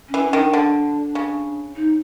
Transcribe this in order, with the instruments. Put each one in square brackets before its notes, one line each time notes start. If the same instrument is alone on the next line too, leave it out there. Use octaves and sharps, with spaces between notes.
[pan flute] C#4
[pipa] E3
[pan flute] C#4
[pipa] D#3
[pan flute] D4
[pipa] D3
C#3
[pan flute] D#4